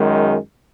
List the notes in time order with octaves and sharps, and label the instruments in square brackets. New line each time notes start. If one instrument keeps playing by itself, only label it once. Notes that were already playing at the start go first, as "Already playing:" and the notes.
Already playing: [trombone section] F#2 D#3 G#3